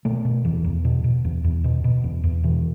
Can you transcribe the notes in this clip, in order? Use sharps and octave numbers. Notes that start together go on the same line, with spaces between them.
B2 A3
B2
E2 E3
E2
B2
B2
E2
E2
B2
B2
E2
E2
B2 E3